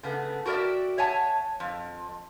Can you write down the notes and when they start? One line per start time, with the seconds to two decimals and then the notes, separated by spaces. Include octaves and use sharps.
0.03 C#3 A3 B3
0.45 F#4 G4 A#4 B4 D5 E5
0.98 C#5 E5 F#5 G#5 A5
1.60 F2